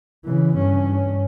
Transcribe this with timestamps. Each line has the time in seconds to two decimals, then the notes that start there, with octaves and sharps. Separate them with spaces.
0.25 C#3 E3
0.57 G2 C#4